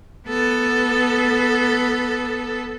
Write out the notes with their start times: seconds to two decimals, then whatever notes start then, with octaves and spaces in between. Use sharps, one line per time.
0.28 B3 A4